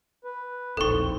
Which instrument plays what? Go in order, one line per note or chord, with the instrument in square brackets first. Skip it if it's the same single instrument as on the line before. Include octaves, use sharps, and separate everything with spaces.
[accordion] B4
[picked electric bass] D1 A#1 [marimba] E2 D#4 [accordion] C4 [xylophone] A4 C#6